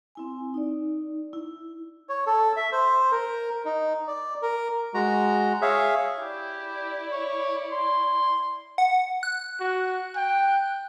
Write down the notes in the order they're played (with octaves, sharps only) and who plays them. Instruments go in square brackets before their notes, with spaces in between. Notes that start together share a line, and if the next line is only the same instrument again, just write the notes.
[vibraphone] C4 E4 G#5
D#4 D5
E4
[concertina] C#5
A4
E5
C5
A#4
D#4
D5
A#4
G#3 F#4 A#5
G#4 C#5 E5 F5
[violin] E4 D5 [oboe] G4
[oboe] C#5
C6
[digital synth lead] F#5
F#6
[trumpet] F#4
G5